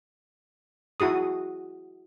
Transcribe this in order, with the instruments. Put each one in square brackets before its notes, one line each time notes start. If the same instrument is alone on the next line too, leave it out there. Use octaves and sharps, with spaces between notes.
[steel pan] E4 F#4 G#4 D#6